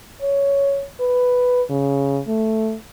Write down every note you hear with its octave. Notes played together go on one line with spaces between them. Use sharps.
C#5
B4
C#3
A3